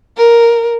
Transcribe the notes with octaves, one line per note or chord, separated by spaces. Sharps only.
A#4